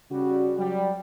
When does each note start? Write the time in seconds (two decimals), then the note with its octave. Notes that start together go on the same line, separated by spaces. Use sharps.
0.11 C#3 G3 F#4
0.57 F#3 G3